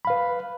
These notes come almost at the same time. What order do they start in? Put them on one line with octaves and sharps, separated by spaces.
B5 F5 B4